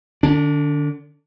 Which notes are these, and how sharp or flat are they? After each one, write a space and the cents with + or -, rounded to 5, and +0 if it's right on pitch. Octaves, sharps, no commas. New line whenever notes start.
D3 +30 D4 -30